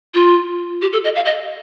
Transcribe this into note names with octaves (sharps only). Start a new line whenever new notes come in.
F4
G4
A4
D#5
F5
D#5